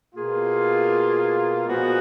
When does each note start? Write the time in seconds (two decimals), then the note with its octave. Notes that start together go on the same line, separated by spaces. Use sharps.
0.13 B2 A#3 F4 G#4
1.65 A#2 F3 G#3 B3 F#4